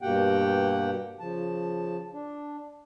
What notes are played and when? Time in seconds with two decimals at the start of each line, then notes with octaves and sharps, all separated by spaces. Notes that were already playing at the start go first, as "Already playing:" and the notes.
0.01 G2 B2 A#3 G4 F#5 G5
1.20 C#3 F3 A5
2.13 D4